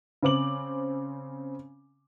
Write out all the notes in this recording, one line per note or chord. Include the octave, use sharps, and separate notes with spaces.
C#3 C4 D6 F#7